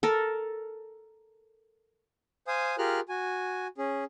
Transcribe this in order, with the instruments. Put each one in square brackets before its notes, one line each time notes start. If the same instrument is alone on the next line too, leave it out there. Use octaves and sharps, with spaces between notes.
[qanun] A4 A#4
[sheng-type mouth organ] C5 F5 G#5 D#6
F4 G4 G#4 A#4 F6 F#6
F#4 G#5
C#4 G#4